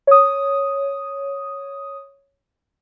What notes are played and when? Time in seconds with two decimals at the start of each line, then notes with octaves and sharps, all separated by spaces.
0.07 C#5 D#6